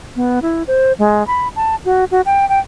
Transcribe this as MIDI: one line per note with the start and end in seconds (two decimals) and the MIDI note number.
0.16 0.40 59
0.42 0.63 64
0.67 0.92 72
0.98 1.25 56
1.27 1.48 83
1.56 1.75 81
1.85 2.05 66
2.11 2.21 66
2.26 2.48 79
2.49 2.59 79